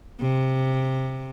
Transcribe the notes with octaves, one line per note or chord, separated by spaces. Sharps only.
C3